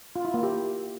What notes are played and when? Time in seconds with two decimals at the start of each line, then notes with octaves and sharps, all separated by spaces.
0.16 F4
0.25 E4
0.34 A#3
0.43 G4